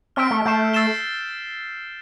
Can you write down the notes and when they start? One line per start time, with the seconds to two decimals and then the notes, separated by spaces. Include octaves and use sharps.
0.16 C4 F6 B6 D7
0.31 A3
0.45 A3 E6 G6 C7 E7
0.74 E6 A6 C7 E7 G7